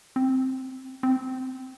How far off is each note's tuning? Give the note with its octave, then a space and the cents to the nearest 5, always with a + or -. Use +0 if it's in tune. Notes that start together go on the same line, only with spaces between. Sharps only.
C4 +0
C4 -15